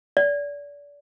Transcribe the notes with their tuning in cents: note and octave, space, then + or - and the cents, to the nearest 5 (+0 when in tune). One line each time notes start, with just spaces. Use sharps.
D5 -30